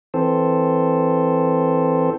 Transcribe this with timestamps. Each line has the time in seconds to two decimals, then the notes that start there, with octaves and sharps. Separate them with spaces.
0.14 E3 C4 A4 C5